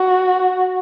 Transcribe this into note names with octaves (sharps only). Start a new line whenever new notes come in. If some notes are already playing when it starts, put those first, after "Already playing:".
Already playing: F#4